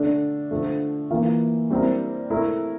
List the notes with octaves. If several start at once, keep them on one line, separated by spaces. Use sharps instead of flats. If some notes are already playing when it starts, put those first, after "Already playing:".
Already playing: D3 A3 D4
D3 F3 A3
E3 A#3 F4
G3 C4 E4 A#4
A3 E4 A#4